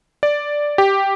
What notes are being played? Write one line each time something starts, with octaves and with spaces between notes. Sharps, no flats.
D5
G4